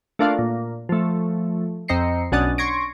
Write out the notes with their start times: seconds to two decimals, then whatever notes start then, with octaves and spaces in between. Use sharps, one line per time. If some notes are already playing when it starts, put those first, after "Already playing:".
0.19 A3 A#3 D4 F4 F5
0.38 A#2
0.89 F3 A3
1.88 F2 C4 D#5 A#5 C7 C#7
2.32 B1 C#4 D4 F#5 D#6 A6
2.58 C6 C#6 G#6 A#6 D7